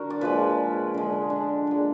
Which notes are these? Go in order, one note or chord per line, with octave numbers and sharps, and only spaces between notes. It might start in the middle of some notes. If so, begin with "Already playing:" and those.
Already playing: D3 F#4 A#4
D5
A#2 F3 G#3 B4
D3 G#3
D4
A#2 G#3